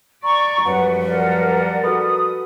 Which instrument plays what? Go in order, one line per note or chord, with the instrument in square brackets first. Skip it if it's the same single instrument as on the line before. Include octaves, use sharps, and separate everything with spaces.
[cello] D5 [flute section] A#5 C#6
[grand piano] F#2 [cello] F3 G3 [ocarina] B4 [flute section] F#5
[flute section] A#4 D5 F#5
[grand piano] F#4 A4 B4 [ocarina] D#6